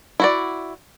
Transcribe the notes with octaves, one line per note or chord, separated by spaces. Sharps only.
E4 F#4 D5